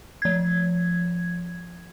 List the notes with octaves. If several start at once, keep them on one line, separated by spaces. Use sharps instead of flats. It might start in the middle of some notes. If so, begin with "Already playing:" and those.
F3 G#6